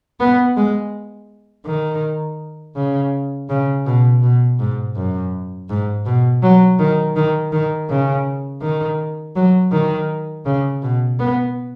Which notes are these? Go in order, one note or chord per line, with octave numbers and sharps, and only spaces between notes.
B3
G#3
D#3
C#3
C#3
B2
B2
G#2
F#2
G#2
B2
F#3
D#3
D#3
D#3
C#3
D#3
F#3
D#3
C#3
B2
B3